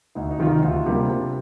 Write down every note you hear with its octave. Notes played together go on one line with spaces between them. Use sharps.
D2 D#4
D#4
C3 D#3 F4
D#4
D2 F4
C3 G3 A#3 D4
C3